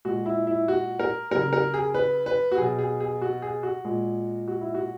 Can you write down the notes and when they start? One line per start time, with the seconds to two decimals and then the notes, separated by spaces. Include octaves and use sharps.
0.05 A#2 G#3 F#4
0.26 E4
0.47 E4
0.68 F#4
1.00 A#4
1.31 C#3 F#3 A#4
1.53 A#4
1.74 G#4
1.94 B4
2.26 B4
2.52 F#4
2.58 B2 F#3 G#4
2.79 G#4
3.00 G#4
3.22 F#4
3.42 G#4
3.63 F#4
3.85 A#2 G#3
4.48 F#4
4.61 E4
4.74 F#4